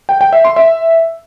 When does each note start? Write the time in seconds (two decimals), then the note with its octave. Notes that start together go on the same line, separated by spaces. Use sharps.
0.09 G5
0.21 G5
0.33 E5
0.44 C6
0.56 E5